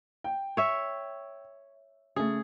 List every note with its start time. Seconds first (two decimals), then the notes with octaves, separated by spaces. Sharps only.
0.24 G5
0.57 C#5 E5
2.16 C#3 A3 G#4